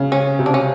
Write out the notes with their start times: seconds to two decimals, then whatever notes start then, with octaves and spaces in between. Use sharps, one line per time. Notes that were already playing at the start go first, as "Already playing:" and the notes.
Already playing: C#3
0.12 C#4
0.39 C3
0.46 D4
0.54 C#4